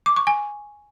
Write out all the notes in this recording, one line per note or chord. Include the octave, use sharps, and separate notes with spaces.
D6
C#6
G#5